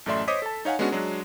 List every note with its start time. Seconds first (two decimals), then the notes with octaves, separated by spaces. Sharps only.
0.06 A1 F#2 A3 D5 E5 C6
0.28 C5 C#5 D#5 D6 D#6 B6
0.42 A4 A5
0.65 D#4 C#5 F5 F#5 G#5
0.79 G#3 B3 C#4 D4 F#4 G#4
0.92 F#3 G#3 D4